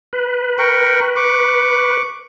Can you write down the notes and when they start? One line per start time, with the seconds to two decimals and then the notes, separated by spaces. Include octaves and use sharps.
0.13 B4
0.59 A#4 G5 C#6
1.16 C#6 D6